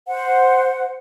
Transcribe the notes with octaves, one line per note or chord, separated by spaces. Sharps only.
C5 F#5